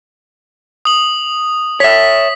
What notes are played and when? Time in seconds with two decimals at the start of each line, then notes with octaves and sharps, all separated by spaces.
0.85 D#6 F#7
1.80 C#5 E5 B6